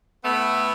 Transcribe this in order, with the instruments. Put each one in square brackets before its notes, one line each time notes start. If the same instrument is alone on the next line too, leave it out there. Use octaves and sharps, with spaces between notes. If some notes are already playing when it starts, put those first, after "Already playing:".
[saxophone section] A2 A3 B3